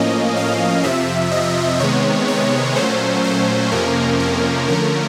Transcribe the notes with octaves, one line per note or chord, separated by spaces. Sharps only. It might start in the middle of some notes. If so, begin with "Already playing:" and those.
Already playing: A2 F3 A#3 C#4 D#5
F5
F2 C3 F3 E5
D#5
C3 D#3 G#3 B3 C#5
C#5
A#2 F#3 A3 C#4 C5
C5
F2 C3 F3 A#3 C#4 A#4
A#4
D3 F3 A3 C#4 A#4